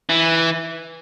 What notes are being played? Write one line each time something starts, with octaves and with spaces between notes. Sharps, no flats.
E3